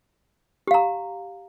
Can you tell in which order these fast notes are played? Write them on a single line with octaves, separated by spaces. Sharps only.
G4 F5 A#5